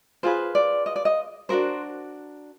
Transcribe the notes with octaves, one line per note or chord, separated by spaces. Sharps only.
F4 G#4 B4 C5
D5
D#5
D5
D#5
D4 F#4 A#4 C5